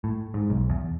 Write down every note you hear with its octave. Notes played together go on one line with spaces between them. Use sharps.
A2
G#2
B1
E2